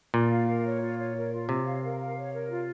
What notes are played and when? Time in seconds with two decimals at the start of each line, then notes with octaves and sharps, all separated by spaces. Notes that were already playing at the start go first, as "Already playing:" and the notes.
0.14 A#2 F4
0.30 F5
0.48 A#4
0.65 C#5
0.81 F4
0.98 C#5
1.16 A#4
1.32 F4
1.49 C3 C#5
1.66 F5
1.83 A#4
2.01 F5
2.17 C#5
2.34 A#4
2.51 F4